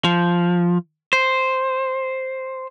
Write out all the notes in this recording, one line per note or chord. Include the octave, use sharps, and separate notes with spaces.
F3
C5